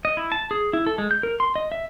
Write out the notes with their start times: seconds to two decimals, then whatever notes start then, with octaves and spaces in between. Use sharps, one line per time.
0.05 D#5
0.17 E4
0.32 A5
0.51 G#4
0.73 E4
0.87 A4
0.98 G#3
1.11 G6
1.23 A#4
1.40 C6
1.56 D#5
1.72 E5